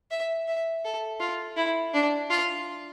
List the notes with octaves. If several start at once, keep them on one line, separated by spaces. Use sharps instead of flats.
E5
E5
A4
F4
E4
D4
F4